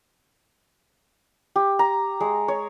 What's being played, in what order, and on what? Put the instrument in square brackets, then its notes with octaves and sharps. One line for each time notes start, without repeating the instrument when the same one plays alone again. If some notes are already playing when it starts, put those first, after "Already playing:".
[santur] G4
A#5
G#3
C#5